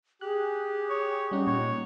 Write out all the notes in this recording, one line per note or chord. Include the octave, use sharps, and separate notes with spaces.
G4 G#4 F#6
C#5
G3 C#4 D#4 F#5
A#2 C#5